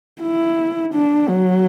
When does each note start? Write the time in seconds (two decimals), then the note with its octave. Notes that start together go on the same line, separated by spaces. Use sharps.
0.22 E4
0.93 D4
1.28 F#3